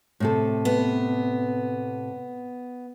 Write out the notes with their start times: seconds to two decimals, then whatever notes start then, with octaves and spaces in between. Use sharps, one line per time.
0.20 A2 C3 A4
0.65 B3